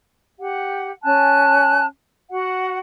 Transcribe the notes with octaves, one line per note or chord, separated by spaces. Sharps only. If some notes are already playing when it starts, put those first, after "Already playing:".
G4 F#5
C#4 G#5 A5 F#6
F#4 F#5